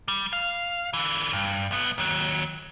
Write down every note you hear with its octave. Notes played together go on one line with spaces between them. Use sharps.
G3
F5
D3 E3
G2
B1 B3
D#2 F#3